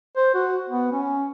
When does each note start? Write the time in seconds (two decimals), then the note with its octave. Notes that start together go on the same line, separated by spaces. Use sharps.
0.16 C5
0.34 F#4
0.69 B3
0.92 C#4